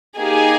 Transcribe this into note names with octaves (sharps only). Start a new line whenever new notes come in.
A#3 D#4 G4 G#4 G#5